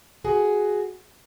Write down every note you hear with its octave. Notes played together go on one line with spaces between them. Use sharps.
F#4 G#4